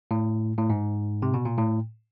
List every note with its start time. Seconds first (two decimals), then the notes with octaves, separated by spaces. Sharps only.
0.11 A2
0.58 A2
0.70 G#2
1.22 C3
1.34 B2
1.45 A#2
1.58 A2